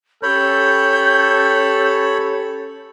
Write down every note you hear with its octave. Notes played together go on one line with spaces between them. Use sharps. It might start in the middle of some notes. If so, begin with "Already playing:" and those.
C#4 G4 A4 C#5 B5 G6